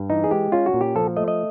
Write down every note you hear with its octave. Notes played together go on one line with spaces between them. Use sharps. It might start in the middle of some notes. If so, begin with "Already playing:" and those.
Already playing: G2
E3 D#4
G#4
G#3 G4
C#4 F4
F#4
A#2
G4
F3 A4
A3 D#5
D#5